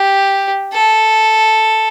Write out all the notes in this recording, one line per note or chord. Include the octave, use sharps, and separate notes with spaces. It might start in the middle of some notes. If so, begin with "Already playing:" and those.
Already playing: G4
A4